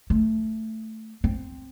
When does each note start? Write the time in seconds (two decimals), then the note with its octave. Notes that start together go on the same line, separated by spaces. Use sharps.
0.10 A3
1.24 C4